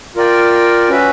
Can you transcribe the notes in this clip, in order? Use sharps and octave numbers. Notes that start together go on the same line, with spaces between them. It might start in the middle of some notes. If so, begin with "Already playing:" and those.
F4 A#4 D5 G5
C#4 F#4 B4 E5